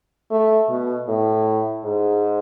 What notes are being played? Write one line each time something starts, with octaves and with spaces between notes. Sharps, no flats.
A3
B2
A2
G#2